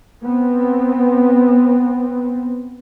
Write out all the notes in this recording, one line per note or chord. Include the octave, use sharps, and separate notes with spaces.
B3 C4